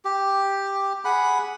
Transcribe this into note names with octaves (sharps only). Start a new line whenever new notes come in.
G4
G#4 F#5 B5